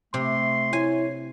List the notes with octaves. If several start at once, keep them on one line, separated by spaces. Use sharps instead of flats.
C3 A3 C6
E4 C#5 G#5